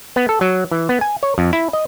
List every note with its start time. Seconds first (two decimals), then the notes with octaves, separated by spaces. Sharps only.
0.16 B3
0.29 A4
0.41 F#3
0.72 E3
0.89 B3
1.01 G#5
1.23 C#5
1.38 F2
1.53 E4
1.73 D#5